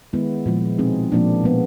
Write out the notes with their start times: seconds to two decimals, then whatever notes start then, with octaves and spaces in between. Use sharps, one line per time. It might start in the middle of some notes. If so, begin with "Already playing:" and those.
0.13 D#3 G#3 B3 E4
0.46 A#2 F3 G#3
0.78 B2 G#3 C4 D#4 G#4
1.12 A#2 F3 A#3 D4 F4
1.44 B2 G#3 B3 D4